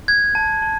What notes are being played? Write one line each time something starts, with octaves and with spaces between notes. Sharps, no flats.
F#6 G#6
A5
A5